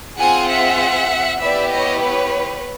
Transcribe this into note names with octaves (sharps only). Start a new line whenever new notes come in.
C4 F4 G#4 F#5 G#5
E5 F#5
B3 E4 G4 D5 E5
C#5 D#5
B4 C#5